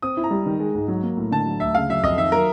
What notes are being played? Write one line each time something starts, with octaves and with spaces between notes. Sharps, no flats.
C4 D#6
E4
A#5
G3
D#3
G#3
G#2
F#3
A#3
A2
D3 A5
F#3
D2 E5
C#3 F5
F#3 E5
F2 D#5
D#3 E5
F#3 A#4